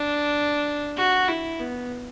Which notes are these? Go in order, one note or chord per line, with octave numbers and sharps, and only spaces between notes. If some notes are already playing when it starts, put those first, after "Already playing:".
Already playing: D4
F#4
E4
B3